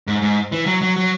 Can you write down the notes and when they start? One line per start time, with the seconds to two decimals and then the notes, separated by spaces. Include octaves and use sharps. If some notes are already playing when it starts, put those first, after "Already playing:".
0.07 G#2
0.22 G#2
0.52 E3
0.66 F#3
0.82 F#3
0.96 F#3